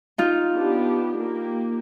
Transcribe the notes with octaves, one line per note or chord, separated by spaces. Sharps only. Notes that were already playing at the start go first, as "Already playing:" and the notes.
D#4 F4
B3 D4 G4
A#3 G4